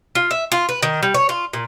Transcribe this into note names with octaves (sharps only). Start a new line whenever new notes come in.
F4
E5
F4
B4
D#3
G3
C#5
F4
A#2